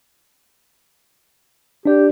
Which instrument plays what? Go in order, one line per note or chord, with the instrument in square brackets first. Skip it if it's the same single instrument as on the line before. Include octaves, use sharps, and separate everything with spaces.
[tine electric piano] D4 D5 [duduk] G4